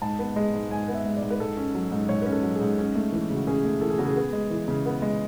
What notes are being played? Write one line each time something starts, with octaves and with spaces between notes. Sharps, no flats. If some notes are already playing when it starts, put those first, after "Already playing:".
G#2 A5
B3
G#3
G#2
G#2 G#5
B3
E5
G#3
D5
G#2
B4
G#2 A4
C#4
F#3
G#2
G#2 C#5
C#4 B4
A4
F#3
G#4
G#2
C#4
A3
E3
C#3
F#4
C#4 G#4
A3
E3 A4
G#4
C#3 F#4
G#4
B3
G#3
E3
C#3
B3
G#3